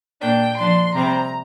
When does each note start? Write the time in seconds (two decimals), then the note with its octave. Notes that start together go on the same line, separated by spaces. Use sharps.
0.21 A#2 A#3 D4 G5
0.58 F3 D4 C6
0.95 C3 G3 C4 A#5